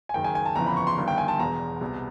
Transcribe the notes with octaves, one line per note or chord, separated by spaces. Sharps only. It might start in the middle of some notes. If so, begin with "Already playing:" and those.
G#5
F#1 F#2 D#3 G5
G#5
G#5
A5
G1 F2 C#3 E3 A#5
B5
C#6
C6
G1 G2 D#3
G5
G#5
A5
E1 E2 B2 A#5
C2 B2